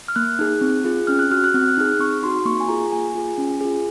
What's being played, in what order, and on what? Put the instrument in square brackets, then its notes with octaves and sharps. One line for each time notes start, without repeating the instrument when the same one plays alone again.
[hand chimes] F6
A#3 F#6
D#4 G#4
C4
F4 G#4
C#4 F6
F#6
F#4 F6
F#6
C4 F6
F#6
D#4 G#4 F6
C4 C#6
D#4 F#4 C6
A#3 C#6
G#5
F4 G#4 A#5
A#3 G#5
F4 G#4
C#4
F4 G#4